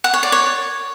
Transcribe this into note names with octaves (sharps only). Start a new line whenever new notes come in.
F#5
C#5
D5
C#5